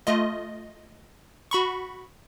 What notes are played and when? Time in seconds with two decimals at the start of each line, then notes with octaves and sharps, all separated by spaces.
0.07 A3 F4 D#5
1.51 F#4 B5 C#6